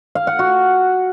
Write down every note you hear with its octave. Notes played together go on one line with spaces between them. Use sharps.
F5
F#5
F#4